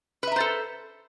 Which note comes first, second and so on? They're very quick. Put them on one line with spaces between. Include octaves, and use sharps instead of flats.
B4 E5 A#5 C5 A4